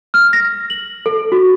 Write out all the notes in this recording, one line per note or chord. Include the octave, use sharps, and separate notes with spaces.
F6
A#6
F#7
A4
F#4